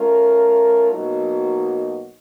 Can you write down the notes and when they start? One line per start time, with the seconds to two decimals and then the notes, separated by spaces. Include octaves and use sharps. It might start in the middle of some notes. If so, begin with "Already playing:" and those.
Already playing: A3 C#4 F4 A#4
0.91 B2 F#3 A#3 D#4 F#4